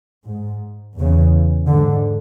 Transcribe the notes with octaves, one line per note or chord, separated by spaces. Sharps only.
G#2
E2 C#3
G#2 D3